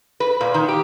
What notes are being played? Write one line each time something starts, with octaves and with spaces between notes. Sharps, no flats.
B4
A#2
D#3
G4